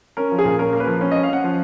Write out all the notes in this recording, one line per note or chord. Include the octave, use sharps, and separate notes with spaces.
C#4 A#4
F3
G#4
A#2
C#4 A#4
A#3
B4
F3
C#4
D#5
C#4
F5
C#4 F#5
F3